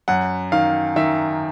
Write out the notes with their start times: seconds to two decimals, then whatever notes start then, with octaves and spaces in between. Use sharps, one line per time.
0.08 F#2 F#5
0.52 D#3 F5
0.96 D#3 E5